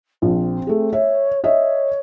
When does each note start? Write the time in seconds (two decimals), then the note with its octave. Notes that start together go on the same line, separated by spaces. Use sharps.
0.22 A#1 C4
0.67 A3 G#4
0.93 C#5 E5
1.44 C#5 D#5 E5